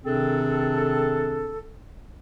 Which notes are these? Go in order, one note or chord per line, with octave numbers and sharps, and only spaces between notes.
C3 D#3 C4 D4 G#4 A4